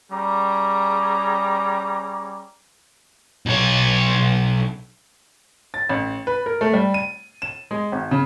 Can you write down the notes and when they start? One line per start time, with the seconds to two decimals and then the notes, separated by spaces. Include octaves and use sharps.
0.11 G3 C#4 G#4 A#5 D6
3.46 B1 C#5
5.74 A6
5.89 A1
6.27 B4
6.46 A#4
6.61 A3
6.73 G3
6.94 D#7
7.42 E7
7.71 G#3
7.92 G#1
8.11 C#3